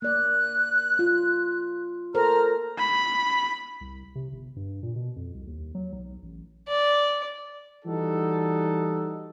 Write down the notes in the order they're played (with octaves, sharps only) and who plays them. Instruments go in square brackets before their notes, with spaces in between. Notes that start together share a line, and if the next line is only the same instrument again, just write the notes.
[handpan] A#3 D5 [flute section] F#6
[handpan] F4
[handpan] A4 A#4 C5 [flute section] A#5 F6
[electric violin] B5
[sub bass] C2
C3
G1
G2
A#2
B2
F2
C2
D#2
F#3
B1
A1
[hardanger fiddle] D5
[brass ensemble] E3 G3 D#4 F#4 A4